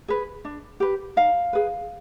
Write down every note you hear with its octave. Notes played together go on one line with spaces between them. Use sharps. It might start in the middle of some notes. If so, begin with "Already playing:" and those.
G#4 B4
D4
G4 B4
D#4 F5
G#4 B4